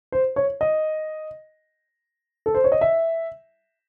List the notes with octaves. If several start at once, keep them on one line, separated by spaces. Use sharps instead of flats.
C5
C#5
D#5
A4
C5
C#5
D#5
E5